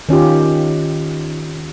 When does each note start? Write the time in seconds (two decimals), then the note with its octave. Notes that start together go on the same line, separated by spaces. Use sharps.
0.09 D#3 C#4 F4 G4